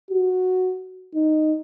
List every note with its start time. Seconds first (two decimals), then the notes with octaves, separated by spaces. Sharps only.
0.11 F#4
1.14 D#4